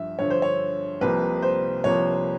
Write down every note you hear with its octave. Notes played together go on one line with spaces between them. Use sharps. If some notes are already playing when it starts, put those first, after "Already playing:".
Already playing: G2 F3 E5
G2 D3 F3 C#5
C5
C#5
C2 C3 F3 A#3 B4
C5
C2 C3 F3 A#3 C#5